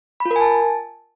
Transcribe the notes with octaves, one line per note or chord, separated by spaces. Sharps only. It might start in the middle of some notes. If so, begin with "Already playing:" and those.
B5
F4
A#4
G#5
A5